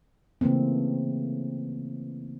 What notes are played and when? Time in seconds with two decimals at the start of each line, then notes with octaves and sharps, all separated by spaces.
0.41 C#3 E3 A3 A#3 C4